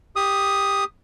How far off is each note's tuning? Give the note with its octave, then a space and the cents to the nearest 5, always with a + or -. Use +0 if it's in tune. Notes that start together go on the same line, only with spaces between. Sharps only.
G4 +10 D#6 +0